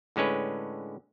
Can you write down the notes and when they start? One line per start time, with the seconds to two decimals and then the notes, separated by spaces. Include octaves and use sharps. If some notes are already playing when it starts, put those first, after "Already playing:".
0.16 A2 D3 G#3 C#4 B4